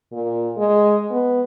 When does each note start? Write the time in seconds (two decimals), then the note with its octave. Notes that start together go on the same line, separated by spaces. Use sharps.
0.12 A#2
0.57 G#3
1.11 B3